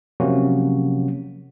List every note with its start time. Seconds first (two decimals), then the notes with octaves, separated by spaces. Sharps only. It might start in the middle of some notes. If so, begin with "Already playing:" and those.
0.20 C3 F3 F#3 A#3 C#4 F#4